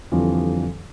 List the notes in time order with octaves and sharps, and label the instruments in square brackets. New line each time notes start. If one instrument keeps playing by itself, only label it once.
[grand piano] F2 D3 E3 F3 G3